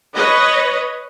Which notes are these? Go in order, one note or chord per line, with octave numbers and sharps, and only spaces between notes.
B4 C#5 D#5